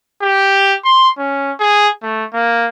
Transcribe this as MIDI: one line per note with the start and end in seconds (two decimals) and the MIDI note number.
0.22 0.75 67
0.84 1.09 84
1.18 1.52 61
1.60 1.89 68
2.03 2.24 57
2.34 2.69 58